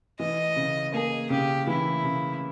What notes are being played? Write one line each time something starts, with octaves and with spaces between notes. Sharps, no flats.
E3 D#5
C#3
A#3 G#4
C#3 G4
E3 E4
C#3